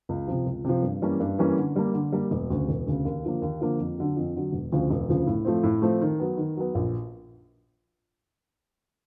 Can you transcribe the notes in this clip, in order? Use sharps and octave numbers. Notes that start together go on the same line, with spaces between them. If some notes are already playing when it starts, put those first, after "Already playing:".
C#2
C3 F3
C#2
C3 F3
G2
E3 G3 A#3 C#4
G2
E3 G3 A#3 C#4
D3
G3 A#3
D3
G3 A#3
E1
D2 C#3
E1
D2 C#3
D#2
D3 F3 A#3
D#2
D3 F3 A#3
F2
D3 F#3
F2
D3 F#3
E1
D2 C#3 F3
E1
D2 C#3 F3
A2
F3 A3 C4
A2
F3 A3 C4
D#3
F#3 B3
D#3
F#3 B3
A#1